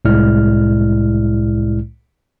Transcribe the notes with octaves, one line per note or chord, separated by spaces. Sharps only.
C2 A2 G#3 E4 D5 F6